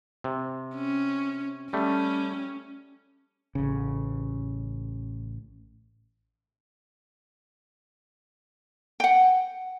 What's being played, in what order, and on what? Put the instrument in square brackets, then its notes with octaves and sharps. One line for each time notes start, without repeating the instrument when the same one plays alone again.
[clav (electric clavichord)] C3
[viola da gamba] C#4
[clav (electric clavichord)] G3 A3 [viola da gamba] C#4
[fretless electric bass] A1 C#3
[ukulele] F#5 G5